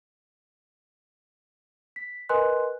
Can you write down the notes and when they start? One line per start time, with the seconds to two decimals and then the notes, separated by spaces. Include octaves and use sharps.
1.96 B6
2.29 A#4 B4 D#5 G#5 C6 F#6